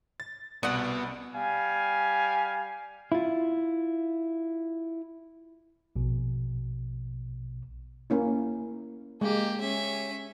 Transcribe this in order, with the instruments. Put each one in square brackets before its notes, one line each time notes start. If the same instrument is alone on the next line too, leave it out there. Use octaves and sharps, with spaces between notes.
[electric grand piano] A6
[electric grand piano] C2 D5 [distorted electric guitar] B2 [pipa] B3 F#5
[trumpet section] G3 F5 G#5
[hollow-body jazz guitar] E4 F4
[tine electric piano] A#1 B2
[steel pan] A#3 C#4 E4
[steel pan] G#3 [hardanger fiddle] A#3 G4
[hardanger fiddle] C#4 E5